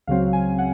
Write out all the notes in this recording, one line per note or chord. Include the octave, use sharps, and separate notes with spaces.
C#2 C#3 F#3 C4 F5
G#5
F#5